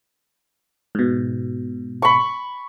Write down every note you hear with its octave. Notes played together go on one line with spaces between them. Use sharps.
G#2 B2
B5 C#6